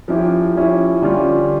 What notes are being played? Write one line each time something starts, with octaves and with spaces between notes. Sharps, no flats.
F3 C#4 E4 G4
F3 C#4 E4 G4
D3 G3 C#4 F4